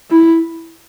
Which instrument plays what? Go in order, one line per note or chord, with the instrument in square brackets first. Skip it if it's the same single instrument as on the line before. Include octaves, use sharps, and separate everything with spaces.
[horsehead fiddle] E4